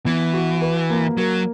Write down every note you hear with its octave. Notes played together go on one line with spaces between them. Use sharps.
E3 B3
F#4
B4
A#3
F#3 A#4